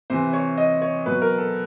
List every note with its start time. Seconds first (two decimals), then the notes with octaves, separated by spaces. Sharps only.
0.10 C3 E3 C5
0.33 C#5
0.57 D#5
0.82 C#5
1.06 B2 F#3 B4
1.22 A#4
1.38 A4